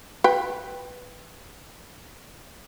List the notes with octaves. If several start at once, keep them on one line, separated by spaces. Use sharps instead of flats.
B4 G5